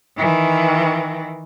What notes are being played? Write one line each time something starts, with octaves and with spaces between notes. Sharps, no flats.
D#3 E3